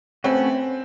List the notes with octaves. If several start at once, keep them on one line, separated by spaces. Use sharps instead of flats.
A3 C4 C#4 F#4 B4